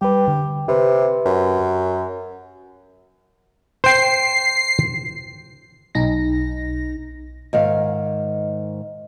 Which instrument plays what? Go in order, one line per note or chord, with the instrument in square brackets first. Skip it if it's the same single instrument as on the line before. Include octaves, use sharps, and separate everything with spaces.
[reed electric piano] G3 B4 [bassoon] G4
[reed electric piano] D3
[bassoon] C3 [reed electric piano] G4 B4
[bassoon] F#2
[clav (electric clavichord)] C5 G5 [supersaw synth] C7
[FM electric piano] B1 D#4 A#6
[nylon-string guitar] G#2 D#3 F5